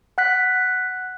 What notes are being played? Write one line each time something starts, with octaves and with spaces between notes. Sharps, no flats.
F#5 F#6 B6